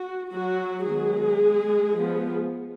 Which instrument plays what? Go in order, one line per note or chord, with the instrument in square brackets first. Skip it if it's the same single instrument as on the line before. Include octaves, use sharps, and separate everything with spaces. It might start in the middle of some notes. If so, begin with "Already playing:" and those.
Already playing: [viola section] F#4
F#3 F#4
D#3 F#3 G#3 B3 G#4
F3 B3